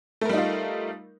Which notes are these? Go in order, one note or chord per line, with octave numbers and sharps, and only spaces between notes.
G3 A3 D#4 F4 A#4